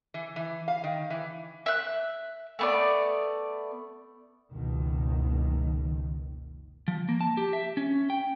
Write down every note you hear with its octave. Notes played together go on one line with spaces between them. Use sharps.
E3
E3
F5
D#3
E3
E5 F#6
A3 B3 D5
F#1 C#2 B2 D#3
F3
A#3
A5
G4
E5
C#4
G5